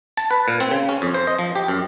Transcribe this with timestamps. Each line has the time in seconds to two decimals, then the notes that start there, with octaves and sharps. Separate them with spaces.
0.17 A5
0.31 B4
0.48 A#2
0.60 C4
0.71 C#3
0.89 C#4
1.02 F2
1.14 C5
1.27 D#5
1.39 F3
1.55 G4
1.68 F#2